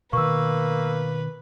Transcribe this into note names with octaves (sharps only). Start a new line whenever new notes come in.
B2 D#3 A#3 B4 C#6 E6